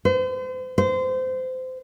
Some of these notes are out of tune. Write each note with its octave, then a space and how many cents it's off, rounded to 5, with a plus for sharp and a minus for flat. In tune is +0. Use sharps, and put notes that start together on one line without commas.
C5 -40
C5 -25